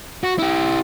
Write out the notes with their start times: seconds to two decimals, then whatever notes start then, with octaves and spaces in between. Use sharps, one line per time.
0.24 F#4
0.39 E4 G4